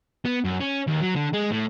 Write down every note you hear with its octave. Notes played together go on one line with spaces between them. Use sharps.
B3
F#2
C#4
D#2
F#3
D3
G#3
A2